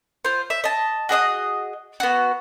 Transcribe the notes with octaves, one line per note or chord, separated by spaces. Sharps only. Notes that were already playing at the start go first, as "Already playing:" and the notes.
F4 C5
E5
D#5 A5
F#4 G#4 D#5 D#6
B3 F#4